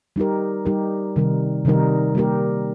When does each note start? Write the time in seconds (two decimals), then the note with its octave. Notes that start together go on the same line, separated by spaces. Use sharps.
0.16 G3 D#4 G4 A#4
0.65 G3 D#4 G4 A#4
1.16 C3 D#3 G3 D#4 A#4
1.65 C3 D#3 G3 D#4 A#4
2.15 G3 A#3 G4 A#4